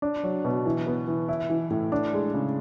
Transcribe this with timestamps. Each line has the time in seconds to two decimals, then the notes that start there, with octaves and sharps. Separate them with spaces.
0.02 D4
0.24 F#3
0.45 B2
0.66 E3
0.87 B3
1.08 E3
1.29 E4
1.50 E3
1.70 A2
1.92 D4
2.13 G#3
2.34 C#3